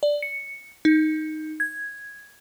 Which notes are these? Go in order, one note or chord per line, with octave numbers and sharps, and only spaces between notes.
D5
C#7
D#4
G#6